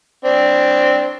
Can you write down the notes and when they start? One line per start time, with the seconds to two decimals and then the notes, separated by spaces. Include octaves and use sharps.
0.24 C4 D4